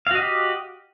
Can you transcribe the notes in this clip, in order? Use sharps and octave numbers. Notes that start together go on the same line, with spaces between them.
F#4 G4 D#5 F5